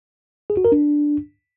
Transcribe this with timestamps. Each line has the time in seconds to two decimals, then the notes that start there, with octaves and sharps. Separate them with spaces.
0.50 G#4
0.57 F#4
0.65 A#4
0.72 D4